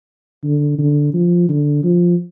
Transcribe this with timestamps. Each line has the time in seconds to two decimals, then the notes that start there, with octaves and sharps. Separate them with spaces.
0.44 D3
0.79 D3
1.14 F3
1.49 D3
1.84 F3